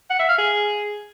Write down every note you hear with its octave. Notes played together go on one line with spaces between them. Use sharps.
F#5
E5
F5
G#4